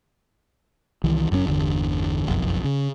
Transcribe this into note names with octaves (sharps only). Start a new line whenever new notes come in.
C2 D#3 E3
F#1 F#2 B2 C#4
G1 E2 D3
F#1 B1 F2
C#3